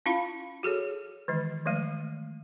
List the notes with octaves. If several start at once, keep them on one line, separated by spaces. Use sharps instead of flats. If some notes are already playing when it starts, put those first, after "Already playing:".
C#4 E4 F4 F5 B5
F#4 G#4 A4 C#5
D#3 E3 G#3
D#3 F3 G#3 A3